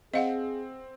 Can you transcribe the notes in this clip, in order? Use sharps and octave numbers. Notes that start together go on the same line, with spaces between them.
C4 G#4 D#5 F5 F#5